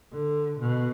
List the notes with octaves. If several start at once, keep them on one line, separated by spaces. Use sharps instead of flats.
D3
B2